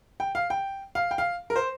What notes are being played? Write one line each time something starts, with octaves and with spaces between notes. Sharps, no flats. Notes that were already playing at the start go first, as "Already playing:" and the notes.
G5
F5
G5
F5
G5
F5
A#4
C5